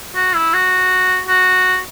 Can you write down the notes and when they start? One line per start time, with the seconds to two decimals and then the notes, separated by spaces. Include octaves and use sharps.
0.16 F#4
0.35 E4
0.54 F#4
1.28 F#4